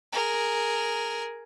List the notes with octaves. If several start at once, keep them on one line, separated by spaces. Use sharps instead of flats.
G#4 A#4